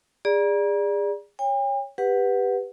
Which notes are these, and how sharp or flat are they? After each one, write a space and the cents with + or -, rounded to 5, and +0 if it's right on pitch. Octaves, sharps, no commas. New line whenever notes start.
G#4 -30 D5 +0 A#5 +40
C#5 +0 G5 +45
G4 +15 B4 +0 F#5 +0